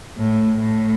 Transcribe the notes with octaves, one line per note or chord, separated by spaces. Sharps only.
A2
A2